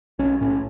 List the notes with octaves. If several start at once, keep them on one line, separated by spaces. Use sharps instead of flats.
B1 C#4
A2 C#4